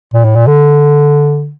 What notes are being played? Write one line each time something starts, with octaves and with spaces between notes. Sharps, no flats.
A#2
A2
A#2
D3